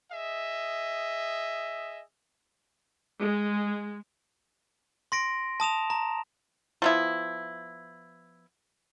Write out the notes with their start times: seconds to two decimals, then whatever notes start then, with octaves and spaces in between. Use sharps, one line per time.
0.12 G#4 D#5 E5
3.20 G#3
5.12 C6 A#6 D7
5.60 A5 D#6 E7 F7
5.90 A#5
6.82 F3 B3 E4